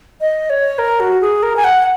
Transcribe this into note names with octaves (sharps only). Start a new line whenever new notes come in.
D#5
C#5
A#4
F#4
G#4
A#4
G#5
F#5